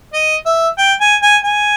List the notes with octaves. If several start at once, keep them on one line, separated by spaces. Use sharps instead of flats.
D#5
E5
G5
G#5
G#5
G#5